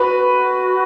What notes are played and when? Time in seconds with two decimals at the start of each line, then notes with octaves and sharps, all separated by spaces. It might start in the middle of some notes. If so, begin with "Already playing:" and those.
Already playing: F#4 B4